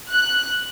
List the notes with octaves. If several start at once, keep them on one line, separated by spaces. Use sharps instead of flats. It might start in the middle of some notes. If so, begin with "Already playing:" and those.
F#6